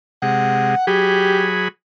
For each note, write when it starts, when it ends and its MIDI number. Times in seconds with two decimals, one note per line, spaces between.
0.22 0.75 48
0.22 0.75 56
0.22 0.84 78
0.87 1.68 54
0.87 1.49 67
0.87 1.68 68
0.87 1.68 83